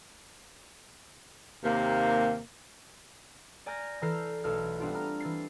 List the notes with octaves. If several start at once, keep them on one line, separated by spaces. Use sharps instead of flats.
D#2 C3 A#3
D5 G#5 A#5 F6 G6 A#6
E3 A4 A#5 F6 G6 C7
B1 A3 A4 F6
G3 B3 C4 D4 F4
A#5 F6
E3 A6 C7